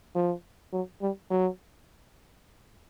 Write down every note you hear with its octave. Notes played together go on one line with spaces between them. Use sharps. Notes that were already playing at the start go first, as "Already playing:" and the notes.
F3
F#3
G3
F#3